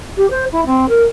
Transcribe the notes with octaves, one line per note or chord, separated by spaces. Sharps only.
G4
C5
E4
C4
A#4